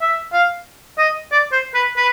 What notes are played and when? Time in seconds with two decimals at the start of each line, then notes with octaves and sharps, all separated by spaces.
0.01 E5
0.33 F5
0.98 D#5
1.32 D5
1.52 C5
1.74 B4
1.97 B4